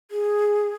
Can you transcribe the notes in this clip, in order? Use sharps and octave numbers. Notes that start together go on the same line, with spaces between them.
G#4